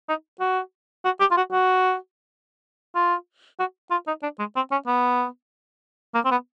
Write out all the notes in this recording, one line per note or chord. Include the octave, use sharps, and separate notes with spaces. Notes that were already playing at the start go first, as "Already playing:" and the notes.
D#4
F#4
F#4
G4
F4
F#4
F#4
F4
F#4
F4
D#4
D4
G#3
C4
C#4
B3
A#3
C4
B3